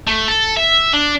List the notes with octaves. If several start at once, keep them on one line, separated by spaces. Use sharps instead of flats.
A3
A4
E5
D4